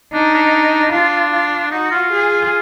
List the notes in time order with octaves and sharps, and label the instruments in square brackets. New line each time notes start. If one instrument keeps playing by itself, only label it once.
[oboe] D4 [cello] D#4
[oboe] D4
[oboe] D4 [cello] F4
[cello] F4
[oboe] D#4 [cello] F#4
[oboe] F4
[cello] G#4